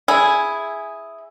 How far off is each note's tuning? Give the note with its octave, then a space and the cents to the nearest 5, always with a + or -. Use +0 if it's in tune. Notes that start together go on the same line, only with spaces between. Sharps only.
E4 +0 G#4 +0